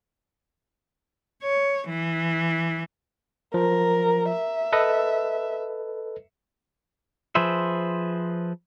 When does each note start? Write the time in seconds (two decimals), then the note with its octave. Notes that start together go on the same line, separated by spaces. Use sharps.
1.43 C#5
1.88 E3
3.54 F3 A#4
4.29 E5
4.73 A4 B4 D#5
7.35 F3 G#4 B4 C5 E5